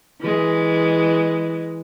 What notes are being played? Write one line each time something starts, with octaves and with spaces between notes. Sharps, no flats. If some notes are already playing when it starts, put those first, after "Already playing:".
E3 G#3